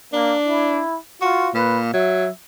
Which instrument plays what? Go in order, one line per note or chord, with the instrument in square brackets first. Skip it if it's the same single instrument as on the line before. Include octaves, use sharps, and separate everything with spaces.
[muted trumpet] A#3 [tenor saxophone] D4
[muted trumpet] E4
[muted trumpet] F4 [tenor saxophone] F#4
[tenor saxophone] A#2 [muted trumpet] B4
[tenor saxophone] F#3 [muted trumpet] E5